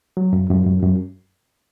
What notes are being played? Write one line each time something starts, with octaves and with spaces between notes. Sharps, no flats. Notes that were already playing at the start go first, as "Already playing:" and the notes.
F#3
F#2
F#2
F#2
F#2